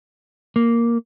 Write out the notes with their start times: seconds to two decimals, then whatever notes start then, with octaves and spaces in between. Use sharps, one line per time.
0.56 A#3